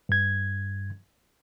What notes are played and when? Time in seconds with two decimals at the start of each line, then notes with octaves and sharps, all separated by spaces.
0.09 G2 G#6